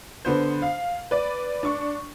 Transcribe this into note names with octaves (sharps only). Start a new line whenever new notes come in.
D3 B3 C5
F5
B4 D5
D4 C#6